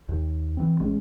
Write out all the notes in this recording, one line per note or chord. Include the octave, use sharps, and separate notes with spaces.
D#2
E3 C4
A1 G#3 C#4